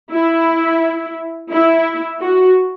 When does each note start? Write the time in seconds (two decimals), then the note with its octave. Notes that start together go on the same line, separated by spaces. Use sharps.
0.11 E4
1.51 E4
2.20 F#4